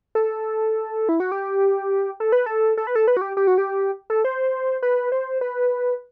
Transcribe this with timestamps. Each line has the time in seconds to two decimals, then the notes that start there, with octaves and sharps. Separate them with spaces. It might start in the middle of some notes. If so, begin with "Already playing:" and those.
0.15 A4
1.09 E4
1.20 F#4
1.32 G4
2.20 A4
2.32 B4
2.46 A4
2.77 A4
2.87 B4
2.95 A4
3.08 B4
3.17 F#4
3.21 G4
3.37 G4
3.47 F#4
3.58 G4
4.10 A4
4.24 C5
4.82 B4
5.12 C5
5.41 B4